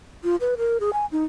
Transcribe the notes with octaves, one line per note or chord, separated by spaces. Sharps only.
F4
B4
A#4
G#4
G#5
D#4